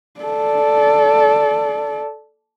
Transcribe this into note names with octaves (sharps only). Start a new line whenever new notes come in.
A4 D5